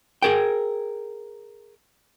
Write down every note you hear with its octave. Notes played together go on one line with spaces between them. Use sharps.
G#4 A#4 G5